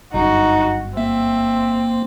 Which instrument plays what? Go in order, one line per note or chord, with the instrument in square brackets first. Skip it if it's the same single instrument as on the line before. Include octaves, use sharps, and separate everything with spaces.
[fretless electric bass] G1 F#2 [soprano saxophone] D#4 [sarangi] F#4
[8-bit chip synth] A#3 [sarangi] C4 [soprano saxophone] E5